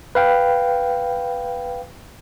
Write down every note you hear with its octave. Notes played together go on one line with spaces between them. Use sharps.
B4 F5 G5